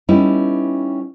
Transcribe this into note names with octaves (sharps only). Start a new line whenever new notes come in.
G3 B3 C#4 D#4 E4